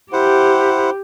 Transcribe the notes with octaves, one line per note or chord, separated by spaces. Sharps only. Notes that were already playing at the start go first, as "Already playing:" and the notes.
E4 G4 C5 F#5